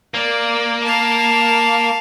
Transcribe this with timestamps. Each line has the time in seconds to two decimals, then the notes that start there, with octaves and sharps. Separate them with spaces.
0.14 A#3 D5
0.83 F5 A5